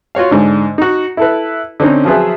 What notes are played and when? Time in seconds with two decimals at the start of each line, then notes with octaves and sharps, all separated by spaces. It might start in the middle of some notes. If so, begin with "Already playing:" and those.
0.15 F4 F#4 C#5 F5
0.31 G#2 D3
0.78 D#4 F#4
1.17 E4 A4 B4
1.80 D3 C4 C#4 D#4
2.05 F3 F#3 F4 G#4 B4 E5